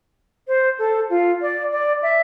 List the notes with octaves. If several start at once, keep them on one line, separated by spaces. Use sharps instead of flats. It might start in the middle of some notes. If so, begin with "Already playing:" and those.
C5
A4
F4
D5
D5
E5